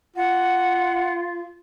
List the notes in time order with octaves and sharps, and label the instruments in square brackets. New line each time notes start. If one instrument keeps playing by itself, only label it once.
[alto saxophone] F4 [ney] F#5